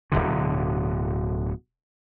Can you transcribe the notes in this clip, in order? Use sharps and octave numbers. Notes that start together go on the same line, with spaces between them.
D1 B1 B2 D3